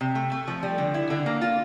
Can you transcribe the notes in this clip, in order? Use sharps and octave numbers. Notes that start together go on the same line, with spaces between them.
C3
A3
A3
F3
G3
D3
E4
D3
A#3
F4